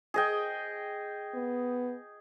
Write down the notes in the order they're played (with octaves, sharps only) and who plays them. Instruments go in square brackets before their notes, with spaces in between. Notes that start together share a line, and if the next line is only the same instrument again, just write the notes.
[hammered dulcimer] G#4 D#5 G5
[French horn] B3